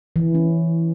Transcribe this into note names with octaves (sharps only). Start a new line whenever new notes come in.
E3
C#4